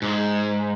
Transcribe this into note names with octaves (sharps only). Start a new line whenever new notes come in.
G#2